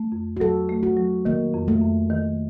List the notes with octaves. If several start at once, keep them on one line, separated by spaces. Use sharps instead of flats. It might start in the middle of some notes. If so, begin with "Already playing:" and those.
Already playing: A3
F2
F#4
F#3 A4
A3
F#4
F#3
D#3 A#3
F2
A3
F2
D#3